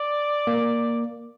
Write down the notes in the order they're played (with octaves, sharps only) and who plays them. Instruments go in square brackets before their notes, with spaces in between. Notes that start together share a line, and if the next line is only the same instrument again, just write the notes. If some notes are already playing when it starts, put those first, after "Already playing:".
Already playing: [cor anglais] D5
[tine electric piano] A#3